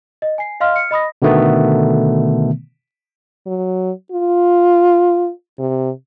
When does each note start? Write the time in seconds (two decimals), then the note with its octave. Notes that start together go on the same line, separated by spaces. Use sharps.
0.22 D#5
0.38 G#5 C7
0.60 D#5 F5 C6 F6
0.75 F6 C#7
0.91 D#5 B5 D#6 A#6
1.22 B2 D3 D#3 A3 B3
3.47 F#3
4.12 F4
5.59 C3